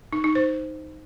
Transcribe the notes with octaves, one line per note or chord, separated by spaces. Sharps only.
D#4
D#4
C5